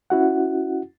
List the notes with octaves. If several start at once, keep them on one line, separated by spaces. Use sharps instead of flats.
C#4 E4 F#4 F#5